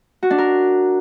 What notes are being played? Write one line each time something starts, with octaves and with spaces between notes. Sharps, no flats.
F#4
D4
A#4